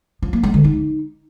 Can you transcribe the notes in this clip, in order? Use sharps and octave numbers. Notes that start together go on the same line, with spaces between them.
F3
A#3
G#3
D3
D#4